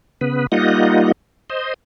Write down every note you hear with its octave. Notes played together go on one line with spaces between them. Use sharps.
C#3 B3 B4
G3 A#3 D#4 F4 D#5 F#5
C5 D#5